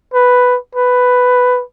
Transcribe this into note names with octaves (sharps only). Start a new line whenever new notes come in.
B4
B4